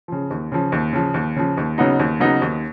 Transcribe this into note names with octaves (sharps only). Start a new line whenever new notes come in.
C#3 F3
D#2
C#3 F3
D#2
C#3 F3
D#2
C#3 F3
D#2
C#3 F#3 B3 D#4
D#2
C#3 F#3 B3 D#4
D#2